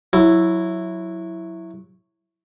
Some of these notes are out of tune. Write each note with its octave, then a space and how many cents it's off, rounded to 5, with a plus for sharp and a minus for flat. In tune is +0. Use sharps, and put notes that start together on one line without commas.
F#3 -10 E4 +0